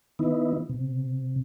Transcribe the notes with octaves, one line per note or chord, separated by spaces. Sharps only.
D#3 B3 D#4 E4
C3